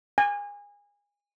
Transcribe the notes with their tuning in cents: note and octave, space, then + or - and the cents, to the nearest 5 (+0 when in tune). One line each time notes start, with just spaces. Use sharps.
G#5 -25